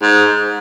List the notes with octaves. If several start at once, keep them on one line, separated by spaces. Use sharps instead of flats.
G#2